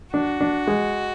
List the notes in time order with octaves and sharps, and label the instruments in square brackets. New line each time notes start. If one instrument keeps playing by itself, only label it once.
[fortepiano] D4 [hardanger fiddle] F#4
[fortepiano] D4
G#3